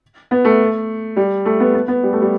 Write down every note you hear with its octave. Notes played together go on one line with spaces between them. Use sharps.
B3
A3
G3
A3
B3
B3
B3
G3
A3
G3